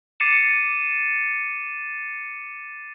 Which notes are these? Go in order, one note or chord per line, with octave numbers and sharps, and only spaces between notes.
D6 A6 C7 C#7 D#7 E7